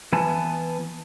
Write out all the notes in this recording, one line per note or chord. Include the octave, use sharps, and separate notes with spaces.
E3 B3 G#5 A5